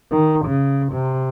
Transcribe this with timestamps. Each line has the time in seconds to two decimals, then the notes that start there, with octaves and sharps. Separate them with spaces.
0.11 D#3
0.46 C#3
0.93 C3